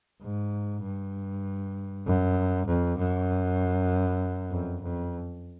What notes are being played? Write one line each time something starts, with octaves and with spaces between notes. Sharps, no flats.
G#2
G2
F#2
F2
F#2
F2
F2